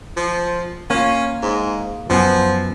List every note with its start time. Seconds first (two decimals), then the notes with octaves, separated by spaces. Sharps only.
0.17 F3
0.90 A#3 C#4 F4
1.42 G#2
2.10 F#2 F3 B3 G#5